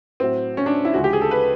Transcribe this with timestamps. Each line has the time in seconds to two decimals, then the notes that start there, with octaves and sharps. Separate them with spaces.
0.20 A2 F#3 C4
0.57 C#4
0.66 D4
0.85 E4
0.94 D2 C#3 F3 G#3 F#4
1.04 G4
1.13 G#4
1.21 A4
1.31 B4